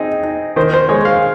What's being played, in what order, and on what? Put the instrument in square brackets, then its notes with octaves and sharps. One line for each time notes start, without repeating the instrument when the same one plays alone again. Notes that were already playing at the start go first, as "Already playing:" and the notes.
Already playing: [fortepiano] C4 D#4 G#4
D#4
D#3 C5
C5
G#3 C#5
F5